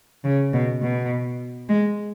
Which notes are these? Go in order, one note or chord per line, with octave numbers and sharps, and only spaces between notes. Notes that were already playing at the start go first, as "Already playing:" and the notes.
C#3
B2
B2
G#3